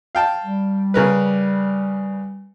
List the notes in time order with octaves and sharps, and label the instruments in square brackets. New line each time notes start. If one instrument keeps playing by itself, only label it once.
[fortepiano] F5 G5 A5
[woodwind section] G3
[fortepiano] C#3 A#4 B4